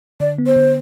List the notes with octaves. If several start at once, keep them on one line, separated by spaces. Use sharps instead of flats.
D3 D5
B3
C5
D3